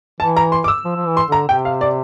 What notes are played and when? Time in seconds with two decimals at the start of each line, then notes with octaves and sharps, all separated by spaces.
0.20 E3 A5
0.37 A#5
0.52 C6
0.64 D6
0.68 E6
0.85 F3
0.96 F3
1.07 E3
1.17 C6
1.28 D3 A#5
1.48 C3 G5
1.65 F5
1.81 D5